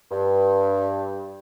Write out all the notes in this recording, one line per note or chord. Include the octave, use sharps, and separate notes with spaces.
G2